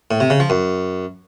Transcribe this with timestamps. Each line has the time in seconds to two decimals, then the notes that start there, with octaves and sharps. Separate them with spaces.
0.11 A2
0.20 C3
0.30 C#3
0.40 F3
0.50 F#2